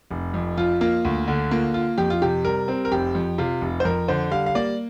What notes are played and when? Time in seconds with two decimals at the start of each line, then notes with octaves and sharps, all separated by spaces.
0.11 F1
0.34 F2
0.57 F3 F4
0.81 A#3 F4
1.05 D2
1.28 D3
1.51 A#3 F4
1.74 F4
1.98 F2 G4
2.10 F4
2.22 C3 G4
2.44 G3 A#4
2.68 C4
2.85 A#4
2.92 F1 G4
3.15 F2
3.38 C3 F4
3.61 F1
3.80 C5
3.85 F2 A#4
4.08 D3 C5
4.31 G3 F5
4.46 F5
4.55 A#3 D5